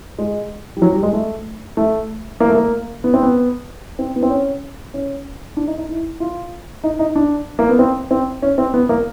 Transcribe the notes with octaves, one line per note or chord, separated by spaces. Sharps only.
G#3
G3
F#3
G3
G#3
A3
A3
A#3
A3
A#3
B3
C4
B3
C4
B3
C4
C#4
C#4
D4
D#4
D#4
E4
F4
D#4
D#4
D4
A#3
B3
C4
C4
C#4
C4
B3
A#3